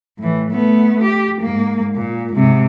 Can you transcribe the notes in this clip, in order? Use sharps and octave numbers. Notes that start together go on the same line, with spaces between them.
A2 E3
A3 B3
G4
G#2 A#3
A#2
G#2 C3